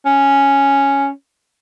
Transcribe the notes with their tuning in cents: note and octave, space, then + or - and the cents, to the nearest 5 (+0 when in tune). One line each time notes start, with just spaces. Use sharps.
C#4 +0